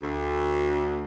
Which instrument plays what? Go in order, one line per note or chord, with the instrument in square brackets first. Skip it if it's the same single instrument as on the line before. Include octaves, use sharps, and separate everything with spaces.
[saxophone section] D2